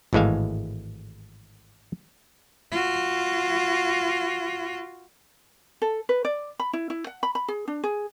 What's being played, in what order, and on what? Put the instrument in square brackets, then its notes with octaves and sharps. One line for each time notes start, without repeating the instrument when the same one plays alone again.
[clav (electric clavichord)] G#1 A2 E3 G#3 E5 F5
[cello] F4 F#4
[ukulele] A4
B4
D5
B5
E4
E4
F#5
B5
B5
G#4
D4
G#4